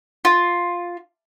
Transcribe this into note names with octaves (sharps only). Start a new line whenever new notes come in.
F4